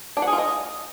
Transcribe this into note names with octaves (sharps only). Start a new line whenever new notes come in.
D4
F#5
G#4
F4
D#5